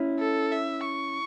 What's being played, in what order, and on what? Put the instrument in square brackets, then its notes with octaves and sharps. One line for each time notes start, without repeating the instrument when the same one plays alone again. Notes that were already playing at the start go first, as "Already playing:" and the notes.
Already playing: [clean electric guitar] C#4 E4
[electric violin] A4
E5
C#6